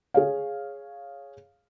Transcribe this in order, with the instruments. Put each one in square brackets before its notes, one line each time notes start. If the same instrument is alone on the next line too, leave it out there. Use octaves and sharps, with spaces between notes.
[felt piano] G#4 C#5 F5